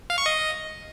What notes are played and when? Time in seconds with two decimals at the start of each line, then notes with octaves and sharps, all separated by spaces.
0.10 F5
0.18 C#6
0.26 D#5